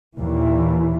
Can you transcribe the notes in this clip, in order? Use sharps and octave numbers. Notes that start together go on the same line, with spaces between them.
D#2 A#2 E3